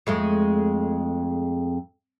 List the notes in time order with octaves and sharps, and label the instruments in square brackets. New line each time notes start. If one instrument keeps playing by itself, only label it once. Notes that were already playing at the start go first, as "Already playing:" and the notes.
[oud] F2 G#3 A3